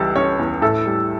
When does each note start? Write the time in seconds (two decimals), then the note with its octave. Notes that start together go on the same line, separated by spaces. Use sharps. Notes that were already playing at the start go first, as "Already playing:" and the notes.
Already playing: C#2 E3 G3 A4
0.16 C#4 C#5
0.39 E2
0.62 A2 A4
0.86 G3